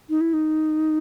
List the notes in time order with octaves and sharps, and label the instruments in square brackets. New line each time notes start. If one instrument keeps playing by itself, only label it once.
[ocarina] D#4
E4
D#4